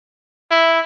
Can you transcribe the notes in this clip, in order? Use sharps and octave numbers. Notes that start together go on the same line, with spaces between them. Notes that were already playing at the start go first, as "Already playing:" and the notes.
E4